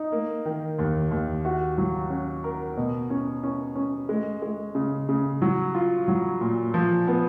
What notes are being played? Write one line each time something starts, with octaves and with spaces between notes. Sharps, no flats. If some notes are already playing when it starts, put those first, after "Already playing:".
Already playing: D#4
A#3
D#3
D#2
D#2
F#4
F#3
C#4
A#4
B2
C#4
C#4
C#4
G#3
G#3
C#3
C#3
F#3
F4
F#3
A#2
F3
B3